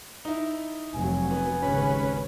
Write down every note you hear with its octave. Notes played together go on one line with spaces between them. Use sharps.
D#4 E4
F1 F#3 G#5
B3
G#1 D#2 C#3 C#4 B4